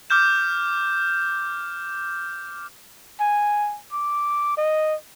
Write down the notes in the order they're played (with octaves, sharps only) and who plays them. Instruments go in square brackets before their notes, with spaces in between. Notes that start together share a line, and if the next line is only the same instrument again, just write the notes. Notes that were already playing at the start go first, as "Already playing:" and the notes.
[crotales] D6 F6 G6 E7
[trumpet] G#5
D6
D#5